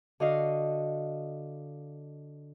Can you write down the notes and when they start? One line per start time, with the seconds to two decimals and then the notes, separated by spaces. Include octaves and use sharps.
0.20 D3 F#4 D#5 F5